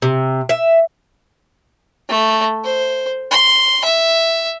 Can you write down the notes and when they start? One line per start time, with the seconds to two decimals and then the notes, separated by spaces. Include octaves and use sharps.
0.02 C3
0.49 E5
2.09 A3
2.65 C5
3.31 C6
3.84 E5